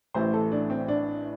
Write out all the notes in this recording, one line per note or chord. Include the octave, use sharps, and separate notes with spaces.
A1 A2 E3 C5
A4
D4
C4
D4